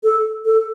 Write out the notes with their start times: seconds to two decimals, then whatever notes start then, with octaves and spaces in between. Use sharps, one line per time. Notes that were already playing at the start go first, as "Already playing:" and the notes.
0.03 A4
0.45 A4